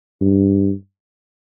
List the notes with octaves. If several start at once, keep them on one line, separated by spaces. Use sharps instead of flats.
G2